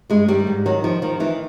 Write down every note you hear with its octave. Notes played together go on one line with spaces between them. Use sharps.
G2 G#3
D#3 G3
G#2
D#3 F#3
D#3 F3
D#3 F3
D#3 E3